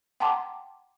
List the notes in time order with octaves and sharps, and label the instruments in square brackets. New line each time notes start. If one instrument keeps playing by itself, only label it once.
[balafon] F#5 G5 A5 A#5 C6 D6